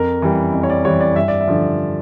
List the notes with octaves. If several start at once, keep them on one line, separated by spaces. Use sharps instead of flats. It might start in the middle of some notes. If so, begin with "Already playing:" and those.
Already playing: F2 A#4
E3 G3
F2
C#5
D5
E3 G3 C#5
D5
G2 E5
D5
E5
D3 F3